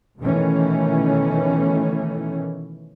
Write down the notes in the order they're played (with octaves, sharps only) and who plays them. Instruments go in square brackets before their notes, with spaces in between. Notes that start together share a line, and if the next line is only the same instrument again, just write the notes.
[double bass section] B2 D#3 E3 A3 C#4